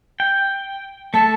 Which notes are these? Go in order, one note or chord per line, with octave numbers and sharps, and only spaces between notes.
G5
A3 A4 A5